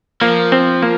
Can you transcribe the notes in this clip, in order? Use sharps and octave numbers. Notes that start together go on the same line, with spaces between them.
F3 A#3
C4
A#3